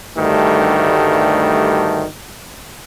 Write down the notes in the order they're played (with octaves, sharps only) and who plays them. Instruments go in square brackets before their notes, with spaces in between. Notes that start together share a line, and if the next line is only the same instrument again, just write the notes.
[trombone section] D2 G2 D#3 G3 A3